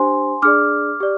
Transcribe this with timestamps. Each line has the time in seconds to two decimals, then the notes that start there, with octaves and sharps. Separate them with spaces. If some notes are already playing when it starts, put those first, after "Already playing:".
Already playing: D4 G4 C5 G#5 C6
0.42 D4 G#4 D5 D6 F6
1.00 G4 D5